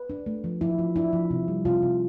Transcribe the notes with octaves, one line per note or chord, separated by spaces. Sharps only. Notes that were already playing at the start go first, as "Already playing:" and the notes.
Already playing: B4
D4
A3
F3
F3 E4
F3
D4 E4
F3
C3
G3
C3 F4
C3